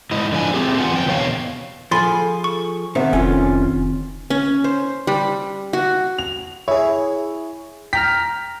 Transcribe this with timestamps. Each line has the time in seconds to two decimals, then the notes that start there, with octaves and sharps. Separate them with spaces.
0.11 G#2 E4 D#5
0.32 D3 F3 G#5
0.54 A3 C4 G4 G#4
0.78 E2 F4 F#5 G#5
0.93 F2 G5
1.06 E2 B2 C#5 F5
1.91 F3 G#4 A4 G#5 B5 C6 A6
2.44 C#6
2.95 C3 D#3 B3 C5 E5
3.13 F1 C#4 F4 A4
4.30 C#4
4.64 C5
5.07 G3
5.73 F#4
6.18 F7
6.68 E4 G#4 C#5
7.93 G5 A#5 F6 B6